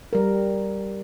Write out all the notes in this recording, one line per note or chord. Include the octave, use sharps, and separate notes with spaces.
G3 A#4